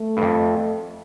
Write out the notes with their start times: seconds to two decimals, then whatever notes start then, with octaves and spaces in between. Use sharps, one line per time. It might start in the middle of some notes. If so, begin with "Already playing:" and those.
Already playing: A3
0.17 G2
0.22 F2